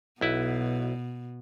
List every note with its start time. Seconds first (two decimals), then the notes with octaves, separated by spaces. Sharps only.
0.21 B1 B2 E4 B4